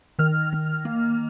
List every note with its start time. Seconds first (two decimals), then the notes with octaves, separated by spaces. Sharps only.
0.19 D#3 F6
0.53 D#3
0.85 A#3